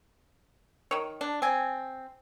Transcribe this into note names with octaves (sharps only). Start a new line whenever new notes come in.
D#3 C#5
D4
C4 G#5